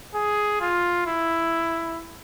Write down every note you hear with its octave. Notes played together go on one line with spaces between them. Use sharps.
G#4
F4
E4